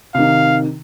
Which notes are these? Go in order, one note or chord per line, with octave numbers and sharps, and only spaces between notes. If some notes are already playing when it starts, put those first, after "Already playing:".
C3 D#3 F5